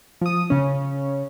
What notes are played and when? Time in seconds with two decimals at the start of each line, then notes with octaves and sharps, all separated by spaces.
0.21 F3 D#6
0.50 C#3 C#4